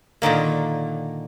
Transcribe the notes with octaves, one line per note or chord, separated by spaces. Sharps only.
A#2 D3 D#3 A#3